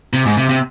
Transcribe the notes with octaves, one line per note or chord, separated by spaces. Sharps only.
C3
G#2
C3
C3